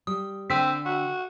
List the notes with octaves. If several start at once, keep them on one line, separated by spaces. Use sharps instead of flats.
G3 D#6
D3 C4 G5 E6 B6
F#4